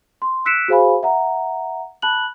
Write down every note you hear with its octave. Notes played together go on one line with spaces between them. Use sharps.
C6
E6 F#6 B6 C#7 D7 E7
F#4 G#4 C5 F5 G#5 B5
E5 F#5 A#5
A5 B5 F#6 F#7